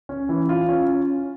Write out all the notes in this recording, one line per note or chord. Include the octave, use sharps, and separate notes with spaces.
C#4
E3
F4
C#4